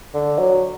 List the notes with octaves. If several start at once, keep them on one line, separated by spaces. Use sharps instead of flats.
D3
F#3